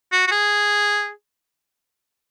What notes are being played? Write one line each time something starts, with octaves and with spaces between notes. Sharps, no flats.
F#4
F#4
G#4